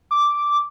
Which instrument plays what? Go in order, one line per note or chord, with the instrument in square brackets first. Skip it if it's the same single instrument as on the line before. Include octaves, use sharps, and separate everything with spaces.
[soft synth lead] D6